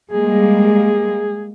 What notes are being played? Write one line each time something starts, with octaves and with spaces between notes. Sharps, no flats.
G3 G#3 A#3 G#4